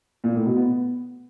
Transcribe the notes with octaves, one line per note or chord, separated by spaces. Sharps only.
A#2
A2
B2
B3